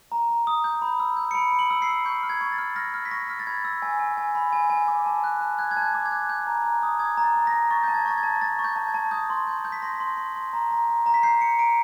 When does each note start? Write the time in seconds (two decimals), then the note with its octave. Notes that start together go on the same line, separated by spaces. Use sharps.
0.12 A#5
0.29 A#5
0.47 D#6
0.64 G6
0.82 B5
1.00 E6
1.17 G6
1.31 C#7
1.34 B5 D7
1.53 B5
1.59 F#7
1.71 E6
1.82 C7
1.87 E6
2.05 C#6 G6
2.23 F6
2.30 G#6
2.41 C#6
2.52 A6
2.58 F6
2.76 F6 A#6
2.94 F6
3.05 B6
3.11 C#6 A#6
3.29 F6
3.39 A6
3.47 B5 G#6
3.65 E6
3.82 G#5
3.99 G#5
4.17 G#5
4.35 B5
4.53 G#5
4.70 G#5
4.88 D6
5.06 A5
5.24 F#6
5.41 A5
5.59 F#6 G#6
5.71 G#6
5.77 A5
5.82 G6
5.95 D6
6.06 G#6
6.11 F#6
6.29 G6
6.47 A#5
6.64 A#5
6.83 D#6
6.99 D#6 G#6
7.17 A#5
7.24 A6
7.35 A#5
7.47 A#6
7.53 A#5
7.71 C#6 A6
7.84 A5 G6
7.94 G#6
8.06 C#6 A6
8.18 G#6
8.23 A5
8.41 A5 A6
8.59 C#6
8.64 G6
8.76 A5
8.88 G#6
8.94 A5
9.11 D#6 G6
9.30 C6
9.47 G6
9.65 G6
9.72 B6
9.82 C6 A#6
10.00 C6
10.17 C6
10.36 C6
10.53 A#5
10.71 A#5
10.88 A#5
11.06 A#5
11.14 B6
11.23 G6 C7
11.41 A#5 C#7
11.59 A#5 D7